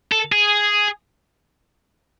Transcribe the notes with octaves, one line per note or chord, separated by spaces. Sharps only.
A4
G#4